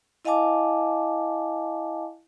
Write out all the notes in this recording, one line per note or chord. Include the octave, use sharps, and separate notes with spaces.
E4 D#5 F5 G#5 A5 D6